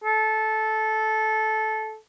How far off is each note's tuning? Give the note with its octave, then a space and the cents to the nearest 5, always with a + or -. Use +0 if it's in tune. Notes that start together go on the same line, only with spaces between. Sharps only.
A4 -15